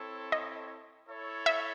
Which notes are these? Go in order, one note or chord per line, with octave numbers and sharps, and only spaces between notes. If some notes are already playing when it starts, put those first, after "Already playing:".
Already playing: C4 E4 A4 C#5
D#5
E4 A4 C#5
E5